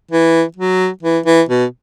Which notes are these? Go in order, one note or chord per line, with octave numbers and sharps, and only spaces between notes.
E3
F#3
E3
E3
B2